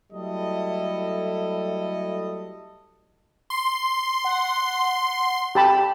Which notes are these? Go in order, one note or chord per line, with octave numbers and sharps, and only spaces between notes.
F#3 G3 A3 E4 A4 D#5
C6
F#5
G4 A5 B5